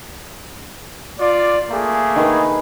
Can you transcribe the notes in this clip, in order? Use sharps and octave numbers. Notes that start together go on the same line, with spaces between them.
F4 D5
A3 A#3 G#4
D#3 B4